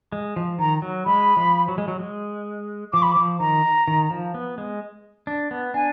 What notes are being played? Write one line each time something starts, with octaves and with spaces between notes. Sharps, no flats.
G#3
F3
D#3 A#5
F#3
G#3 B5
F3
F#3
G#3
F#3
G#3
F3 D6
B5
D6
F3
D#3 A#5
D#3
F3
B3
G#3
D4
B3
D4 G#5